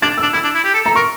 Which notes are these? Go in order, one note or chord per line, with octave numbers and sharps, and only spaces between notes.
D4 A6
D4 E6
E4 E6
D4
E4
G4
A4
A4 A#5
A#4 C#6